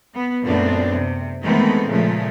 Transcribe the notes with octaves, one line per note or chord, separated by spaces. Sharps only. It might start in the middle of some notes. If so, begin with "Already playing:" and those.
B3
F#2 A#2 A3 B3 C4 D4
C3
D#3 E3 G#3 A3 B3 C4
A#2 C#3 F3 G#3 A3